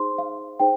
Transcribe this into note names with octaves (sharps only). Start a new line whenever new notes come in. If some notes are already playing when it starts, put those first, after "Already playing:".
Already playing: D#4 G#4 C5 C6
F5
D#4 G#4 C5 G5